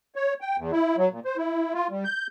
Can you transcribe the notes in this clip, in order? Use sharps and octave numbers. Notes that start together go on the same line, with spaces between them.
C#5
G5
E2
E4
F#3
A#2
C5
E4
F4
G3
G6